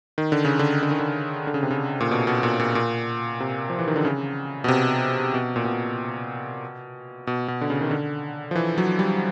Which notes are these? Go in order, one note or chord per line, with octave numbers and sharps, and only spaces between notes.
D#3
D3
C#3
D3
D3
D#3
D3
D3
C#3
C3
C#3
A#2
B2
B2
A#2
A#2
A#2
C3
F3
E3
D#3
D3
C#3
B2
C3
B2
A#2
B2
B2
B2
D3
C#3
D#3
D3
F3
E3
F#3
G3